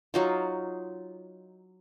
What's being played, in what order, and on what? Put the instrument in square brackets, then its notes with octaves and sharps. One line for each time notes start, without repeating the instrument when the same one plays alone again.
[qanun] F#3 D#4 F4